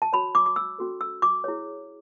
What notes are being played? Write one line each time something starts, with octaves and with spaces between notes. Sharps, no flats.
A5
F#4 C#5 B5
D6
D6
E6
C#4 F#4 A4
E6
D6
E4 G#4 C#5